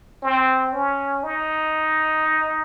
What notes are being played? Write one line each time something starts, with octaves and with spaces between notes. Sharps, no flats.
C4
C#4
D#4